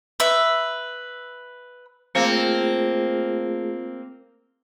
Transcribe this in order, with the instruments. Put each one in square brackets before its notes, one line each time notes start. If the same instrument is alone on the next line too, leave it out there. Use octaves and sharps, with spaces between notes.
[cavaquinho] B4 E5
[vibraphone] A3 F4 G#4 [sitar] A#3 C4